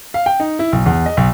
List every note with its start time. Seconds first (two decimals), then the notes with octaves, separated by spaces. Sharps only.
0.14 F5
0.26 G5
0.40 D#4
0.59 E4
0.73 B1
0.86 E2
1.06 D#5
1.17 B1